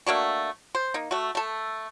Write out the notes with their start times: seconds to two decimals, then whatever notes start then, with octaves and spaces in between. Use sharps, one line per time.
0.06 A3 A#3 D4 F#4
0.75 C5
0.94 A#3 D#4
1.11 A3 F#4
1.35 A3 A4